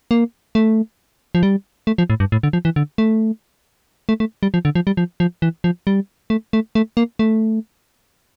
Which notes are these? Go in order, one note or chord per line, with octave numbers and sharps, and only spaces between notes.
A#3
A3
F3
G3
A3
F3
A2
G2
A2
D3
F3
E3
D3
A3
A3
A3
G3
F3
D3
F3
G3
F3
F3
E3
F3
G3
A3
A3
A3
A#3
A3